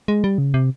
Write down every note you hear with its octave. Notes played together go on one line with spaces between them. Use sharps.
G#3
G3
C#3
C3